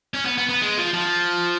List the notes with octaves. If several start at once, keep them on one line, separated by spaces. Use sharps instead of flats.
C#4
B3
B3
B3
G#3
F3
F3